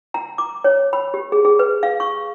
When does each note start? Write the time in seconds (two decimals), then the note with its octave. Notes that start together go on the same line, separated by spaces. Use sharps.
0.14 A#5
0.38 D6
0.64 C#5
0.93 B5
1.14 G4
1.32 G#4
1.45 G#4
1.59 B4
1.83 F5
2.00 C#6